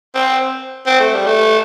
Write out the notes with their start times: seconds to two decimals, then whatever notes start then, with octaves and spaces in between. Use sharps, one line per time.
0.15 C4
0.87 C4
1.00 A3
1.14 G3
1.26 A3